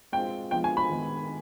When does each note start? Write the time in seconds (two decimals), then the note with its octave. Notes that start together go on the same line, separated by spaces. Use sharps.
0.12 G#3 C4 F4 G5
0.51 F3 G#3 B3 F4 G5
0.64 G#5
0.77 B5
0.89 D#3 G#3 B3